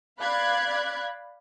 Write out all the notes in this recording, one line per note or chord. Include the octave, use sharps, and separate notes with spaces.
D5 F5 B5 F#6 G#6